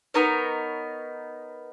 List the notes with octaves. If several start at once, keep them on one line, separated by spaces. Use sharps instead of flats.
B3 D#4 A#4 C#5